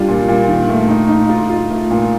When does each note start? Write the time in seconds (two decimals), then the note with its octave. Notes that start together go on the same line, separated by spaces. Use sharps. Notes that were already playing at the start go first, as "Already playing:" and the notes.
Already playing: G3 D4 F4
0.08 A#2
0.28 A#2
0.48 D#3
0.69 A3
0.89 D#4
1.09 D#4
1.29 F4
1.50 F4
1.71 A3
1.91 A#2